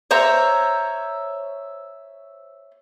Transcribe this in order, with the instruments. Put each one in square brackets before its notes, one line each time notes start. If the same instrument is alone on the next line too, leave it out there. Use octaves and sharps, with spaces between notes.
[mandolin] C5 C#5 E5 A#5